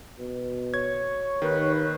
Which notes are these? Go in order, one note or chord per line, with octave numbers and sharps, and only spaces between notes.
B2
C#5 G#6
D#2 D#3 B4